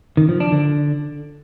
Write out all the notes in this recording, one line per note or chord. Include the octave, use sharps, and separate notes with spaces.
D#3
F3
D4
D3